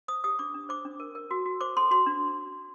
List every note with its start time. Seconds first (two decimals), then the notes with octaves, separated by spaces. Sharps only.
0.08 C5 D#6
0.24 G4 D#6
0.39 D4 D6
0.54 D4
0.69 C5 D6
0.85 D4
1.00 A#4
1.15 A#4
1.31 F#4
1.46 F#4
1.61 C5 D6
1.77 A4 C6
1.91 F#4 C6
2.06 D4